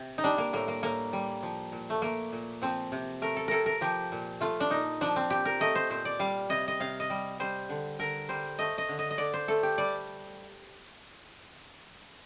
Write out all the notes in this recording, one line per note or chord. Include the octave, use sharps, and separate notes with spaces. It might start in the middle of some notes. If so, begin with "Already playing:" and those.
Already playing: C3
D#4
G3 D4
A#3
A2 A#3
A#3
A2 A#3
G3
F3
A#2
A3
A3 A#3
A#2
F3 C4
C3
A3 A#4
A4
C3 A4 A#4
A#4
F3 G4
A#2
A3 F4
D4
A#2 D#4
F3 D4
C4
A#2 G4
A#4
A3 D#5
C5
A#2 C5
D5
G3 F5
C3 D#5
D#5
C3 F5
D#5
G3
G3 C5
D3
D3 A#4
G3 C5
A3 D#5
D#5
D3
D#5
D#5
D3 D5
C5
A3 A4
G4
G3 D5